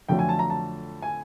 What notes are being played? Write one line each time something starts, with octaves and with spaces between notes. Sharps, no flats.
F2 D3 F#3 A3 G5
G#5
A5
A#5
A5
G#5